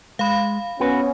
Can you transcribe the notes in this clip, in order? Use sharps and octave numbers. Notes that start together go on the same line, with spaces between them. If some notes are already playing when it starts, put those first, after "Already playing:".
G#3 F5 B5
B3 C#4 F#4 B4